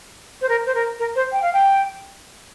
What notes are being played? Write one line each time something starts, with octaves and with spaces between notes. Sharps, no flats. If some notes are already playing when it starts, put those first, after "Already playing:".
C5
A#4
C5
A#4
A#4
C5
G5
F5
G5